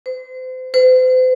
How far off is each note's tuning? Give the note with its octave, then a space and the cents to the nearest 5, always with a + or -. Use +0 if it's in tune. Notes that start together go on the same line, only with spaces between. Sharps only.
C5 -35
C5 -40